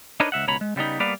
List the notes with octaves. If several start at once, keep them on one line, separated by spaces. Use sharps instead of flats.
D4 D#4 A#4 B4 C#5 D#5
C#2 E5 F#5
C#2 B2 C#5 A#5 B5
G#3
C#3 G3 B3 D#4
G3 A#3 B3 B4 D5 F5